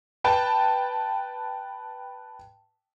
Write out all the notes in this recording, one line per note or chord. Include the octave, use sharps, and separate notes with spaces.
B4 G5 A5